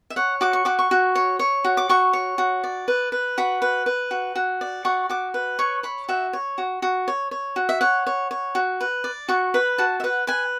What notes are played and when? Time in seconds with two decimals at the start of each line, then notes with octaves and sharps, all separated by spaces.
0.10 E5
0.16 C#5 F#5
0.41 F#4 D6
0.53 C#6
0.65 F#4 D6
0.79 C#6
0.91 F#4
1.15 C#5
1.39 C#5
1.64 F#4
1.77 D6
1.89 F#4 C#6
2.13 C#5
2.38 F#4
2.64 D5
2.88 B4
3.12 B4
3.38 F#4 B5
3.62 B4
3.86 B4
4.11 F#4
4.35 F#4
4.61 D5
4.85 F#4 C#6
5.09 F#4 D6
5.34 B4
5.59 C#5 C#6
5.83 C#5 B5
6.09 F#4 E5
6.33 C#5
6.58 F#4
6.82 F#4
7.08 C#5
7.31 C#5
7.56 F#4
7.69 E5
7.81 C#5 F#5
8.07 C#5
8.31 C#5
8.55 F#4
8.81 B4
9.04 D5
9.28 F#4 C#6
9.54 B4 B5
9.78 F#4 A5
10.00 E5
10.04 B4 F#5
10.27 B4 G#5